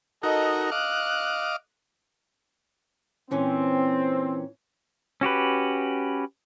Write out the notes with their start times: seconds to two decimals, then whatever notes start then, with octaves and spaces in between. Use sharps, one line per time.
0.23 D#4 F#4 A4 A#4 D#5
0.72 D#5 F5 D6 F#6
3.31 A#2 E3 C4 C#4
5.21 C#4 F#4 G4 B4